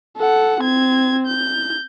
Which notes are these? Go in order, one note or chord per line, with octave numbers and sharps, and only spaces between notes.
A4 F#5
C4 G#6
G6